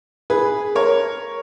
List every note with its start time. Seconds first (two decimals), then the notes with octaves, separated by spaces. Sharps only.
0.30 G#4 B4
0.75 A#4 C#5